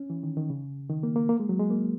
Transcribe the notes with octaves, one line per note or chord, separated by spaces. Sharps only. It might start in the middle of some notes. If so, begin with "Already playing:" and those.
Already playing: C#4
E3
D#3
D#3
C#3
D#3
A#3
A#3
A#3
G#3
F#3
G#3
A#3